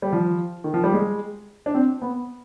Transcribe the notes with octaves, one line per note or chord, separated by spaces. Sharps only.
G3
F3
D#3
F3
G3
G#3
D4
C4
B3